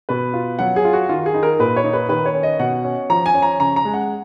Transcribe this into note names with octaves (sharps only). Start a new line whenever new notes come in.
B2 B4
F4
F#3 F#5
G#4
F4
F#4
D#3 F4
G#4
D#4
A#4
A#2 B4
C#5
D#4
B4
D#3 B4
C#5
C#4
D#5
B2 F#5
C#4
F3 A#5
G#5
C#4
A#5
C#3 A#5
A#5
G#3
F#5